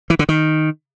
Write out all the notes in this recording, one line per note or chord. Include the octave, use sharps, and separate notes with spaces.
E3
D3
D#3